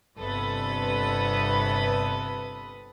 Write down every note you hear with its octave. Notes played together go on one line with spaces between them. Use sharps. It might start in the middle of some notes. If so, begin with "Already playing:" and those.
G1 C3 A4 B4 D#6